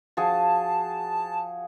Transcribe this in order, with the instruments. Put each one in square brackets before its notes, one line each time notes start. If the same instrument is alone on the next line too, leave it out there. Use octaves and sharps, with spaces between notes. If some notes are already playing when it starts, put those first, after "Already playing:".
[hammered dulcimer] F3 F#4 G#4 [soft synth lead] A5